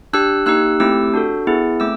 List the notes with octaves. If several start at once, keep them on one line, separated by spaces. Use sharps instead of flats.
D4 G4 E6 F#6
A#3 D#4 G4 E6 F#6
A3 C4 E4 G4 D6 E6
D4 F#4 A4
B3 E4 G#4
A3 C4 D6 E6